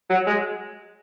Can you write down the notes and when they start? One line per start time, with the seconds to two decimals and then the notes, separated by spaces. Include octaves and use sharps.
0.10 F#3
0.27 G#3